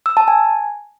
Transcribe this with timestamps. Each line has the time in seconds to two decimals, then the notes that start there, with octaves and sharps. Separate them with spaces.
0.06 E6
0.17 A5
0.28 G#5